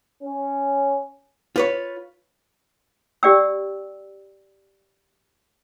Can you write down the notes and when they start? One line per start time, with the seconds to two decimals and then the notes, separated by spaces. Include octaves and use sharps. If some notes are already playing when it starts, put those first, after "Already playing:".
0.23 C#4
1.56 F4 B4 C#5
3.23 G4 D5 G5 E6